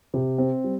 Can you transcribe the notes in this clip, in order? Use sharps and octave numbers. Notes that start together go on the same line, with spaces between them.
C3
C4
G3